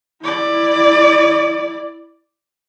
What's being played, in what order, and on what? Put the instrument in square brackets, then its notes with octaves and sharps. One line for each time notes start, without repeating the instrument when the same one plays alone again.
[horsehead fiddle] E4 D5